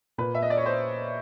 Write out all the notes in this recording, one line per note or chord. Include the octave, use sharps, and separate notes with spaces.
A#2 B4
E5
D#5
D5
C#5
C5